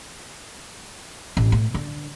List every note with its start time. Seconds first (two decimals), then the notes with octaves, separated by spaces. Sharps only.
1.37 A1
1.52 A2
1.74 D3